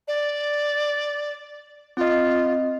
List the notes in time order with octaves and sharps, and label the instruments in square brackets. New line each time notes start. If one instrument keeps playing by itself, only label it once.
[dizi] D5
[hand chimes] C4 D#5 [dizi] F4